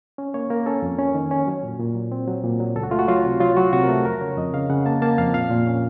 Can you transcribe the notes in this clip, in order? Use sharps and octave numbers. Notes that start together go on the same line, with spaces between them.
C#4
A#3 C#5
A#3 A#4
C#4 A4
F2
C#4
D#3
C#4
F#3
A#2
A#2
F#3
C4
F#3
A#2
F#3
C#2 A4
F#4
A3 F4
F#4
F#3 F4
C3
F#3 F4
F#3 F#4
C3 F#4
A#4
A3 A4
F2 A#4
C#3 C#5
F2 D#5
C#3 F5
C#3 F#5
A#3 A5
A#3 A5
F2 F5
A#2 F5
A#2
C#4